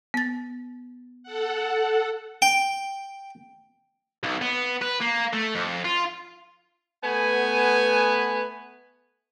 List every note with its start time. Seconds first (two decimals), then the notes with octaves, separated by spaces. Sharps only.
0.14 B3 A6
1.23 A4 F#5
2.42 G5
4.23 B1
4.42 B3
4.81 B4
5.00 A#3
5.33 A3
5.55 F2
5.85 F4
7.03 A3 B3 G#5